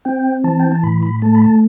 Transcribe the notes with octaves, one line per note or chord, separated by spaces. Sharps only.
C4 G5
E3 A5
G5
A5
A2 B5
B5
A3 A5
B5
A5